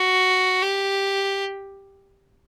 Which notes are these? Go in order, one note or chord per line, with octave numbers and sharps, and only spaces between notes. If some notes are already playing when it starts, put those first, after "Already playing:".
Already playing: F#4
G4